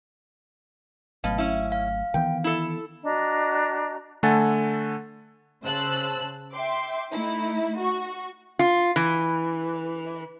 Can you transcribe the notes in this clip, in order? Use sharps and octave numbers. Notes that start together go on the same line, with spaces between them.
G#1 B2 F#3 A3 F5
C#4 E4
F5
D#3 E3 B3 G5
E4 A4
D4 F#4 D#5 A#5
D3 A3 A4 F#5 G#5 A6
C#3 C5 A5 E6 F#6
E5 G5 C6 D6
A3 D#4 E4
F#4 C#6
F4
E3